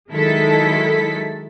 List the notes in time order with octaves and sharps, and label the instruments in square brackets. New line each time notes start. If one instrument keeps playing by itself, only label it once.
[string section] D#3 F#3 G#3 E4 A4 B6